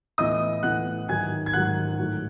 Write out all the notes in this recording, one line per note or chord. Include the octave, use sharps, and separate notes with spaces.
A2 E3 B3 D#5 D#6
A2 E3 B3 F#5 F#6
G#2 D#3 F#3 G#5 G#6
G#6
G#2 D#3 F#3 F#5 F#6
A2 F#3 A3